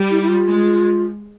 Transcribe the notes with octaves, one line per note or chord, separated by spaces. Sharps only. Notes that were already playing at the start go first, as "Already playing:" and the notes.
Already playing: G3
E4
E4
F4
G#3